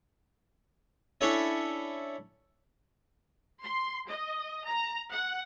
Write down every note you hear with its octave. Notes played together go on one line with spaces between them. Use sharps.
C#4 D4 E4 A4 C#5
C6
D#5
A#5
F#5